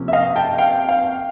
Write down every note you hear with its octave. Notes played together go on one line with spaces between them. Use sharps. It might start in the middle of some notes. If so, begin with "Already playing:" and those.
Already playing: C3 F3 A#3 C#4
E5
D#5 F5
G5 A5
F5 G5
F5 G5